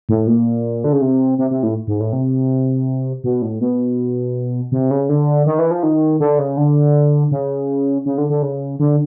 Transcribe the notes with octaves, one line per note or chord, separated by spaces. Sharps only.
A2
A#2
D3
C#3
C3
C3
C3
A2
G#2
A2
C3
B2
A2
B2
C3
C#3
D3
D#3
E3
F3
D#3
D3
C#3
D3
C#3
C#3
D3
D3
C#3
D3